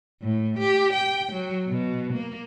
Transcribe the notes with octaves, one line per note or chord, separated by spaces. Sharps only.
A2
G4
G5
F#3
B2
A#3